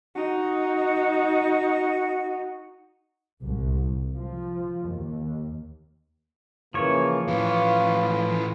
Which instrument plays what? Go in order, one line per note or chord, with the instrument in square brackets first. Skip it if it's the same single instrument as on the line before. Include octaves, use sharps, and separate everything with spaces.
[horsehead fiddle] D#4 [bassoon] F#4
[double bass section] C2
F3
D#2
[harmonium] C#3 E3 A#3 [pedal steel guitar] F3 C#5
[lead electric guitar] A2 E3 [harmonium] F4 B4 [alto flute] F5